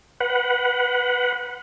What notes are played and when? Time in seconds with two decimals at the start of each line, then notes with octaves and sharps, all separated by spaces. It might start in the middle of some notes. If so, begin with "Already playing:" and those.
0.20 B4 F#5